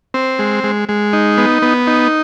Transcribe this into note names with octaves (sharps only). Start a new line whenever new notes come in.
C4
G#3
G#3
G#3
D#4
B3
B3
D#4